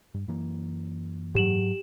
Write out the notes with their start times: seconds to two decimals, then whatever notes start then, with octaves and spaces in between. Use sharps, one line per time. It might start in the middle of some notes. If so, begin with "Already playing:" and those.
0.14 G2
0.28 F#2 E3 A#3
1.35 G#2 F#3 G4 E7 F#7